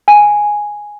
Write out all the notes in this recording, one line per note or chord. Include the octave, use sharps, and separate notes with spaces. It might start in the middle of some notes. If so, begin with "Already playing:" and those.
G#5